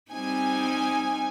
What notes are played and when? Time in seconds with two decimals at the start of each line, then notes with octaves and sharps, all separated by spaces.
0.12 G3 C4 D#4 G#5